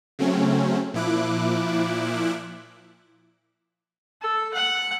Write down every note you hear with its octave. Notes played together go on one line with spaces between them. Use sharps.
C#3 F#3 A3 C4 C#4
A#2 F3 E4 D6 F#6
A4
F#5